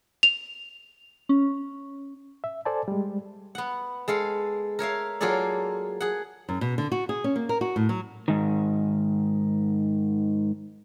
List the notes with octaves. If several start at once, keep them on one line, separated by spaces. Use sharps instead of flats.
F7
C#4
E5
A4 C5 D5 G#5 A5
G3 G#3
B3 F#5
G#3 A4 F5
A#4 C#5 E5 F5
F#3 A#3 F4 G#4 A4 D5
G#4 F#5
F#2
B2
D3
F#4
G#4
C#4
A#3
A#4
F#4
A2
F#3
G#2 D#3